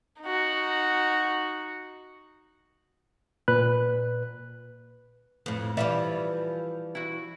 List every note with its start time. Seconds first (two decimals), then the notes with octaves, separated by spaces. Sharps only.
0.22 D#4 F#4
3.48 A#2 B4 F#6
5.46 F2 A2 B4
5.77 E3 F3 G3 D5 E5
6.95 E4 F#4